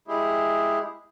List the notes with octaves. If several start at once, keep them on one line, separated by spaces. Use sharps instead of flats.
G#3 E4 G4 G#4